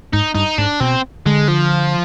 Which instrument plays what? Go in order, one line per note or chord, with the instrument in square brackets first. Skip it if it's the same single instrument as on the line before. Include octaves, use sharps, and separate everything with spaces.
[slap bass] G#2 [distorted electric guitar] D#4
[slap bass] G2 [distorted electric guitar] D#4
[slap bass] G#2 [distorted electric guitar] D4
[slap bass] B2 [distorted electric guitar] C4
[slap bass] D3 [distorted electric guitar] G#3
[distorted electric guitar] F3